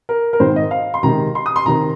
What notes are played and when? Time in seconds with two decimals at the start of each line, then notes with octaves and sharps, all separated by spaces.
0.09 A#4
0.33 A#4
0.40 G#2 D#3 C4 C5
0.56 D#5
0.71 F5
0.94 C6
1.03 C3 D#3 G#3 D#4 A#5
1.35 C6
1.46 D#6
1.56 C6
1.66 C3 D#3 C4 A#5